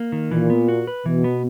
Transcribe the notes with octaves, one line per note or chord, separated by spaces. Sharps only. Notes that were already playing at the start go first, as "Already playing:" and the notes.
Already playing: A#3
D#3
A#2 E3
B3
F#4
B4
B2 E3
B3